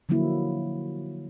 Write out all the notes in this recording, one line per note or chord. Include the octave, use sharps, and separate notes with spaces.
D3 F3 F#3 A#3 E4